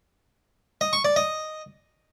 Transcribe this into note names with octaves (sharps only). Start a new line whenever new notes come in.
D#5
C#6
D5
D#5